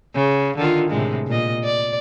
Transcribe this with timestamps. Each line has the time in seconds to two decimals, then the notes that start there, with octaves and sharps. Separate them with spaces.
0.15 C#3
0.57 D3 D#3 F4
0.90 A2 C3 G#3
1.27 A#2 D#5
1.64 D5